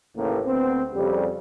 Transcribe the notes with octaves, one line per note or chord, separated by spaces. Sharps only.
A1 D#2 A2 C#3 A#3
D2 B3 C4
F2 C#3 G3